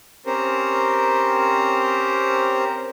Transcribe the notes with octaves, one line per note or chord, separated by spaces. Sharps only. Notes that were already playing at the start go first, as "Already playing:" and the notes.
C4 C#4 G4 A#4 C5